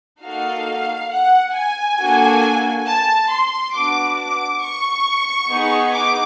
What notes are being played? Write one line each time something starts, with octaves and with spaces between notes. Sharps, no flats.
A#3 D#4 F#4 A4 F5
F#5
G#5
A#3 D4 F#4 A4
A5
C6
B3 D4 F#4 D6
D6
C#6
B3 D#4 G#4
D6